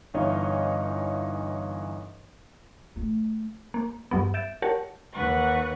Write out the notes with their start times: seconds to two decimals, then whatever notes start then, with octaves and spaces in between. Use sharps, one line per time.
0.14 G1 E3 D#4 C#5 D#5 F5
2.96 A3
3.74 A#3
4.11 G2 F#3 B3
4.34 E5 G6 A6 D7 E7
4.62 G4 A#4 C#5 F#5 A5
5.13 D#2 B4 F#5 C#6